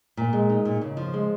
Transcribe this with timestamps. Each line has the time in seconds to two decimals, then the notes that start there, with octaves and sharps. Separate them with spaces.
0.17 A#2
0.33 G#3
0.50 D#4
0.65 A#2
0.81 C#3
0.97 F3
1.14 G#3